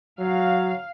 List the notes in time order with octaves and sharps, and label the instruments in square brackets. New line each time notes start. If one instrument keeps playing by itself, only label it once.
[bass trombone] F#3 [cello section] F5